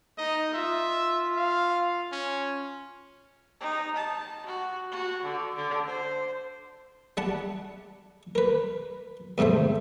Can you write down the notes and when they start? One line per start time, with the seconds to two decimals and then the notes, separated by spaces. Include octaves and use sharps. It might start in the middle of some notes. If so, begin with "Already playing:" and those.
0.18 D#4 D#5
0.54 F4 E5
1.36 F5
2.12 C#4
3.60 D#4
3.96 A5
4.46 F#4
4.92 F#4
5.23 D3
5.55 D3
5.86 C5
7.17 G3 F#5 A5
8.35 A#4 B4
9.38 D#2 G#2 C3 A3 C5